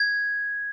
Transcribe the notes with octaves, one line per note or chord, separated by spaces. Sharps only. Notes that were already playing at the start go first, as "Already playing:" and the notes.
Already playing: G#6